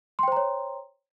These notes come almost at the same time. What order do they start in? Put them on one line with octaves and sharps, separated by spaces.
C6 G5 C5 A#5 C#5